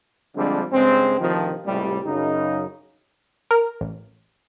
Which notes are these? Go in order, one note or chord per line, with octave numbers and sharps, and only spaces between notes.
D3 F3 G3 G#3 C4 D4
G2 C#3 G#3 C4
D2 C3 D#3 F3
C#2 A2 C3 G3
F#2 C#3 D#4
A#4
A1